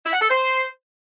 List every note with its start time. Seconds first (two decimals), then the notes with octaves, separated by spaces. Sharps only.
0.05 E4
0.13 F#5
0.21 A4
0.29 C5